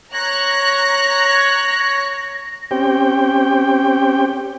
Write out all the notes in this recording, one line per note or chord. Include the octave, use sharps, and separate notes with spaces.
C#5 A#5 F#6 A#6
C4 C#4 G4 G5